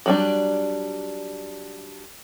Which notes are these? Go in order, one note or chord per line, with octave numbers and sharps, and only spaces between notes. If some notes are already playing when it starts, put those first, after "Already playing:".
F#3 G3 D4